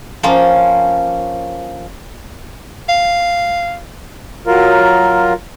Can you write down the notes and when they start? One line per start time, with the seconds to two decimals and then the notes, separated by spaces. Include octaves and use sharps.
0.23 F3 A#3 C#4
2.89 F5
4.47 F#3 F4 A#4